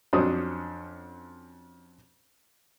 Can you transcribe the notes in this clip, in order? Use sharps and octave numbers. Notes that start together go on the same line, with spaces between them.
F2 F#3 C#4 D4 C5 D#6